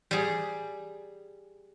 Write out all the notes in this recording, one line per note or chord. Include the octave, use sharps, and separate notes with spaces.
G3 G#4